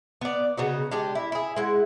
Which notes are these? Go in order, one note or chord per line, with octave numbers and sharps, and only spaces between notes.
B3 D5
C#3 B3 D#4 F#4
G#3 D4 G4
E4
E4 G#4
G#3 E4 F#5